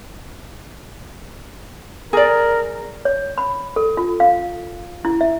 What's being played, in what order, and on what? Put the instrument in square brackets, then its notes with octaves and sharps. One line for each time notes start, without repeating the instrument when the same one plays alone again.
[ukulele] G#4 D5 [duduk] A#4
[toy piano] C#5
B5
A4
F4
F5
E4
E5